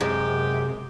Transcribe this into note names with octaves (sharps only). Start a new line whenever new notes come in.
F#2 C3 G#3 G4